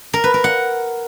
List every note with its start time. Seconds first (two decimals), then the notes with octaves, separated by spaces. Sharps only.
0.13 A#4
0.24 B4
0.34 A#4
0.44 F#5